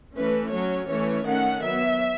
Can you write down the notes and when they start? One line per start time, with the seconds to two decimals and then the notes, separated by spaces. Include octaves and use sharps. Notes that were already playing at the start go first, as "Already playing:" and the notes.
0.16 E3 A3 C#4 B4
0.53 F#3 C#4 C#5
0.90 E3 A3 C#4 C#5
1.26 D#3 A3 C#4 F#5
1.63 F#3 B3 E5